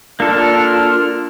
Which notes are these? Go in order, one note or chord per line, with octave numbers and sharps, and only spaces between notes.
A#3 D4 F4 A4 F6